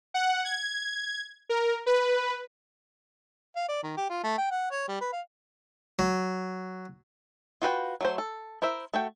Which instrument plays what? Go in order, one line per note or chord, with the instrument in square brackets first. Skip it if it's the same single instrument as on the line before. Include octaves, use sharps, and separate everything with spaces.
[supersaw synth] F#5
G#6
A#4
B4
[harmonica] F5
D5
D#3
G4
F4
A3
G5
F#5
C#5
G3
B4
F5
[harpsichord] F#3
[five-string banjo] F4 F#4 B4 G5
F#3 A3 C5
A4
E4 A#4 C5 E5
A3 F#4 G5